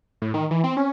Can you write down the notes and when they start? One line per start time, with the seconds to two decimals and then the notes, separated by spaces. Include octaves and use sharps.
0.22 A2
0.34 D#3
0.51 E3
0.64 C4
0.77 C#4